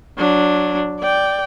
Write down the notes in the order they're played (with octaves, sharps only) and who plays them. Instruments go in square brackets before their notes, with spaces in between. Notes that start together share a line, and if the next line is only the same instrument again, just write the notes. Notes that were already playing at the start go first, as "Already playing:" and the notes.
[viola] F#3 D4
D5 G5